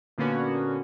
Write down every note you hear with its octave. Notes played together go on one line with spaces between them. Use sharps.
A#2 D3 A#3 B3 C#4 F#4